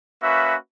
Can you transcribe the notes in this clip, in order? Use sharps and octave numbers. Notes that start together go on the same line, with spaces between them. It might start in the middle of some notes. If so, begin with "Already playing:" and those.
A#3 C#4 F#4 B4 E5